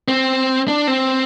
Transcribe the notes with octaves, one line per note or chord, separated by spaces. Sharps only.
C4
D4
C4